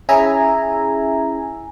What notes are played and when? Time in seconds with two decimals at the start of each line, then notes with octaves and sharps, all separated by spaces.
0.09 C#4 E4 G#4 E5 G#5 A#5